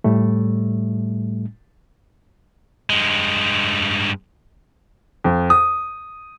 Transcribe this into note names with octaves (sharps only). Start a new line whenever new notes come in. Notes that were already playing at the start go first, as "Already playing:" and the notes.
A2 G3 A3
G2 G#3
F2
D#6